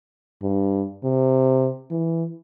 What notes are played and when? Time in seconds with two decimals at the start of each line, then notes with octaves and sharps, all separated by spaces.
0.42 G2
1.04 C3
1.91 E3